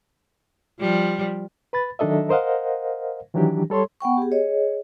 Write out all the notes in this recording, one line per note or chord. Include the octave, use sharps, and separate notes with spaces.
F3 G3
B4 B5 A6
D#3 F#3 D4 A4 D#5 E5
A#4 C5 D#5 F5 F#5
D#3 E3 F#3 D4 G4
G3 A4 C#5 C6
B3 F#5 G5 C#6
G4 G#4
G#4 C#5 D#5